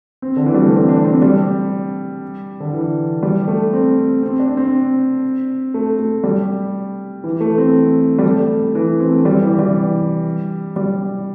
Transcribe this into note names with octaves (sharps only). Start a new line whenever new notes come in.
C4
D3
E3
G3
A3
C4
D4
C4
G3
D3
E3
G3
A3
C4
C4
D4
C4
A3
A3
G3
E3
A3
C4
G3
A3
E3
C4
A3
G3
E3
E3
G3
G3